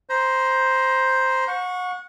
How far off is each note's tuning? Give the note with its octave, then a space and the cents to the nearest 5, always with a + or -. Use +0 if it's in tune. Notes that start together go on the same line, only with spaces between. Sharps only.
C5 +0 A#5 +25
F#5 -35 C#6 +0